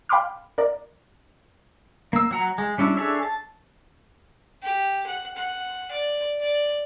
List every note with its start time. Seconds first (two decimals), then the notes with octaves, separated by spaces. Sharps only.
0.09 F5 G5 B5 C6 D6 F6
0.58 A#4 D5
2.13 A#3 E6
2.31 F#3 F#5 A#5
2.58 G#3
2.78 G3 C#4 D4 E4
2.97 D4 G#4 A4 C#5 E5
3.23 A5
4.62 G4
5.07 F#5
5.37 F#5
5.91 D5
6.41 D5